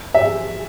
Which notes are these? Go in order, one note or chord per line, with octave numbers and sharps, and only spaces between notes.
E5